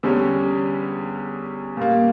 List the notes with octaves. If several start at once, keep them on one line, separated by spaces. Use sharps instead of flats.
E2 D3 G3 C#4
A#2 G3 A#3